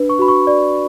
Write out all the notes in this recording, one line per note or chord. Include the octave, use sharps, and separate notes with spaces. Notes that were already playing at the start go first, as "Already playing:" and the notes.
Already playing: D4 B4
C#6
F#4 B5
C#6
D5